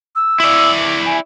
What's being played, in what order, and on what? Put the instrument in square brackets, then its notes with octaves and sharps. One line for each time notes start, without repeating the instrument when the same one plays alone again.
[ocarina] E6
[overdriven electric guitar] E4 D5
[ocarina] G#5